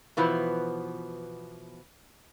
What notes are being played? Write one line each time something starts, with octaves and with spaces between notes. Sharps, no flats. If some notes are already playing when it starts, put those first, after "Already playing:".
B2 E3 F3 B3